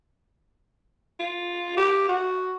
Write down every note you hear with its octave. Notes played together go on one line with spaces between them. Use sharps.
F4
G4
F#4